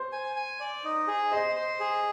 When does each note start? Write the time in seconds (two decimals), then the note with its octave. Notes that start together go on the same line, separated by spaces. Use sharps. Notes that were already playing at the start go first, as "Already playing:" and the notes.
Already playing: C5
0.12 G#5
0.36 G#5
0.60 D5
0.84 D#4
1.08 G#4
1.31 C5 D#5
1.56 C5
1.80 G#4